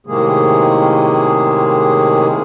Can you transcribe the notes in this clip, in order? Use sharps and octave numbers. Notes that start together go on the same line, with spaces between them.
A2 C3 D#3 G#3 A#3 G#4